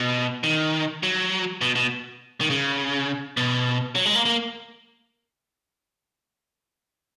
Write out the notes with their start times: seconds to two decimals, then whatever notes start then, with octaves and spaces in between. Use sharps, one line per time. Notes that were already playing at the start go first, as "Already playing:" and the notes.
Already playing: B2
0.44 D#3
1.03 F#3
1.61 B2
1.76 B2
2.41 D#3
2.50 C#3
3.37 B2
3.95 F#3
4.05 G#3
4.15 A#3
4.26 A#3